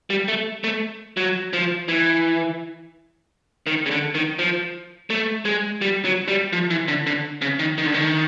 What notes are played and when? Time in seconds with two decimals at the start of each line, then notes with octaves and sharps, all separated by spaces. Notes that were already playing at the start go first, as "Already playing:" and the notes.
0.10 G3
0.28 A3
0.64 A3
1.17 F#3
1.53 F3
1.88 E3
3.67 D#3
3.86 C#3
3.91 D3
4.15 D#3
4.39 F3
5.10 A3
5.45 G#3
5.81 G3
6.05 F#3
6.28 G3
6.53 F3
6.70 E3
6.88 D3
7.07 D3
7.42 C#3
7.59 D#3
7.78 D#3
7.86 D3
7.94 D#3